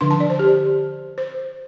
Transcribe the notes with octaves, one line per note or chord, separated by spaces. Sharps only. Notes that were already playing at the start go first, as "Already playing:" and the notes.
D3 F3 D4 C6
A5
D5
C5
G4
C5